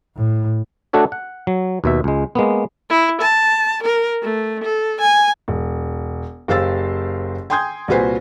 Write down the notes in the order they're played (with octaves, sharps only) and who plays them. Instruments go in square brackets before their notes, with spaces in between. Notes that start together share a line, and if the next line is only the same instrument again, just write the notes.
[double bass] A2
[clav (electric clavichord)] A3 D4 F#4 A4 C#5
F#5
F#3
D#2 B2 E5
C#2 G#3
G#3 A#3 B3
[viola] E4
A5
A#4
A3
A4
G#5
[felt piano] E1
F#1 G4 C5 F5 E6 A6
G5 G#5 C6 D#6 G6 G#6
C2 A#2 F#4 B4 C5 G#5